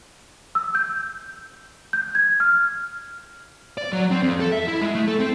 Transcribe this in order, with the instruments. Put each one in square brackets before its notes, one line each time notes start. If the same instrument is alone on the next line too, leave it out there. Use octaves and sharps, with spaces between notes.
[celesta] E6
G6
G6
G#6
F6
[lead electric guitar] D5
F#3
C4
F2
A4
E5
E4
G#3
A3
A4
C4